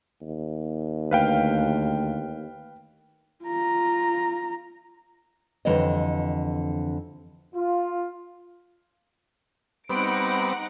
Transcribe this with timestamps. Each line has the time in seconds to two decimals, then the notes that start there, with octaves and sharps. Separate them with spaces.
0.22 D#2
1.11 D2 B4 F5 G5
3.45 F4 A#5
5.65 F2 D3 E3 G3 C#5 D#5
7.55 F4
9.90 G3 B3 C4 D#4 F#5 D7